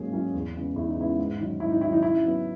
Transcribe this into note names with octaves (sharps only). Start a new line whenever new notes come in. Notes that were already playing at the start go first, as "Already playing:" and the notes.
Already playing: G#2 F#3 A#3 C#4 G#4
F#3 A#3 C#4
E2
C#3 G#3 B3
E2 E4
D#4
C#3 G#3 B3 E4
G#2
D#3 F#3
G#2 E4
D#4
D#3 F#3 E4
D#4
C#3 E4
F#3 B3